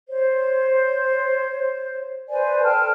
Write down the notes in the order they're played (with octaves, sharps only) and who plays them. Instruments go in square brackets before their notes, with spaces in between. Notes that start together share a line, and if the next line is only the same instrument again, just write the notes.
[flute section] C5 C#5
B4 C5 D5 G#5
A4 G5 A5 F6